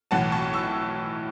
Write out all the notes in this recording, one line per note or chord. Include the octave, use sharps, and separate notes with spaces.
B1 A2 E3 F#5 A5
A5 C#6
C#6 E6